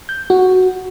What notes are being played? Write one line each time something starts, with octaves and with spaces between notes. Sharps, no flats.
G6
F#4